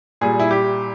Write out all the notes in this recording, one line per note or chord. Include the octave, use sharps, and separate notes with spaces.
A#2 G3 G#4
E4
G4